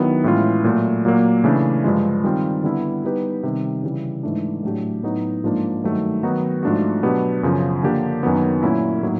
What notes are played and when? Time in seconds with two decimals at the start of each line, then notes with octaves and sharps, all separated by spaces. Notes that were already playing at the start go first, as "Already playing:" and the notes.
Already playing: D#3 F#3 B3 E4
0.24 A2 E3 G#3 C#4 F4
0.64 A#2 F#3 A3
1.05 A#2 F#3 A#3
1.44 C#3 E3 A3 D4
1.84 G2 D3 F3 G#3
2.24 D#3 G3 C4 F4
2.64 D3 G3 B3 E4
3.04 G3 B3 D#4 G4 B4
3.43 C3 D#3 G3
3.83 C#3 E3 G3
4.23 G#2 E3 A3 D4
4.63 A2 F#3 A3 D4 G4
5.03 A2 F#3 B3 D#4 F#4
5.44 G#2 F3 A#3 D4
5.84 G2 D#3 F#3 A3
6.23 D#3 F#3 B3 D#4 F#4
6.63 G#2 F3 A3 D4 F#4
7.03 B2 F#3 B3 D4 G4
7.43 F#2 C#3 F3
7.83 D3 F3 A#3 D4 G4
8.23 F#2 D#3 F#3 B3
8.63 A#2 F#3 A3 C#4 E4
9.03 A2 F#3 A#3 D#4